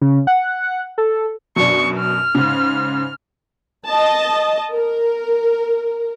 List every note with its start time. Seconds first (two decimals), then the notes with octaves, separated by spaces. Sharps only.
0.01 C#3
0.27 F#5
0.98 A4
1.56 F#2 B2 D4 C#6
1.98 F6
2.35 G#2 C#3
3.88 D#5 A5
4.73 A#4